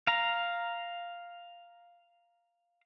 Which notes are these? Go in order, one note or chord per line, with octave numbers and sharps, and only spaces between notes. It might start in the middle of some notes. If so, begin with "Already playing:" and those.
F5 A#5